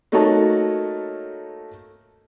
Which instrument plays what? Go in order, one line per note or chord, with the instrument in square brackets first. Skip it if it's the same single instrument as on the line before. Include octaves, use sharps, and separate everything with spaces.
[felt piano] A3 A#3 D#4 F#4 C#5 A5